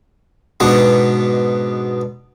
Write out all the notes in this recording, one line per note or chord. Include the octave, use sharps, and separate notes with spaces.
G#2 B2 B3 D4